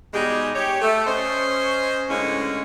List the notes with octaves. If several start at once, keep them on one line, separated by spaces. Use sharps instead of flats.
B2 G3 G#3 D#4 G4 G#4
G4 C#5
A3
C#4 C5 D#5
A2 D3 G#3 A#3 C#4